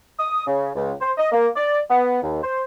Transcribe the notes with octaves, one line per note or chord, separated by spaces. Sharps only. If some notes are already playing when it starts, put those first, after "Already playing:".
D#6
C#3
C#2
C5
D#5
A#3
D5
B3
D#2
C5